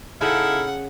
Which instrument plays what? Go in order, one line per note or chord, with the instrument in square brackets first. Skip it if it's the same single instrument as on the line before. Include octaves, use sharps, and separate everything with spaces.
[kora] C#3 [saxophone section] D#4 E4 A4 [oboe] F5 [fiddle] F#5